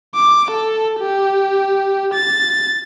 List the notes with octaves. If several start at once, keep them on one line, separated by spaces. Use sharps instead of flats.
D6
A4
G4
A6